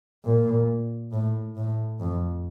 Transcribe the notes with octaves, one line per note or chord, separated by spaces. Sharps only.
A#2
A2
A2
F2